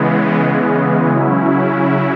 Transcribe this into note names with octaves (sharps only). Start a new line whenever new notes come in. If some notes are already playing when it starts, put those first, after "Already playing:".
Already playing: C#3 E3 G#3 B3
C#3 F#3 C#4 E4